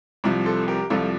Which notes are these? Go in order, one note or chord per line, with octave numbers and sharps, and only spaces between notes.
C2 C3 F3
A4 C5
G4 A#4
C2 C3 F3 F4 A4